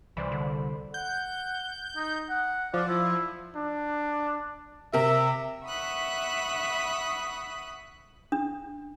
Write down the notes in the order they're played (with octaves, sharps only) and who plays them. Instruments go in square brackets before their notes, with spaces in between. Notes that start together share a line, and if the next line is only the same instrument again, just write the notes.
[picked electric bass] C2 [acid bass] E3 [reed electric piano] C5 D5 B5
[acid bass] D3
[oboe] F#5 [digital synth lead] G6
[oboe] D#4
F#5
[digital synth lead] F3 [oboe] D5
[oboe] E4
[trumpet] D4
[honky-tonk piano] C3 A#4 [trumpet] E5
[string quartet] E5 F#5 B5 C#6 D#6 F#6
[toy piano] D4